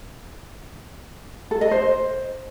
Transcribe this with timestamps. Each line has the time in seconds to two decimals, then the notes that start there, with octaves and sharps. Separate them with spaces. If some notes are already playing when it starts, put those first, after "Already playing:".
1.51 A4
1.61 D#5
1.71 C5